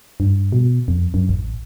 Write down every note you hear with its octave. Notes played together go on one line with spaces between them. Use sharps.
G2
B2
F2
F#2
A1